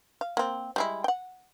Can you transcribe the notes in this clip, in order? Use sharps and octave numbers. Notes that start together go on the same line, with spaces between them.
F5
A#3 C4
G3 G#3 E4
F#5 G5